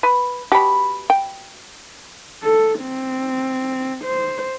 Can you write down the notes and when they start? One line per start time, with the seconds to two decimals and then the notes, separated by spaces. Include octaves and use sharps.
0.03 B4
0.52 B2 G4 B5
1.10 G5
2.43 A4
2.81 C4
4.04 C5